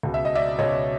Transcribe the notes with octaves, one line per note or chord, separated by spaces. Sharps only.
C#2 B2
E5
D#5
D5 E5
C#2 B2 C#5 D#5